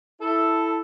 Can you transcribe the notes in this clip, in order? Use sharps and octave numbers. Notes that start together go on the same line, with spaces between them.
E4 A4